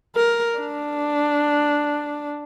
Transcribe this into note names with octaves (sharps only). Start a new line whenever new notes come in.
A#4
D4